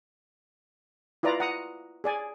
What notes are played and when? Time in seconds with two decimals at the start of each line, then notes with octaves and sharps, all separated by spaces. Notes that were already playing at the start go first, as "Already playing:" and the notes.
1.23 E4 F4 B4 D5 A#5
1.40 F#5 A#5 D#6
2.04 G#4 D5 G#5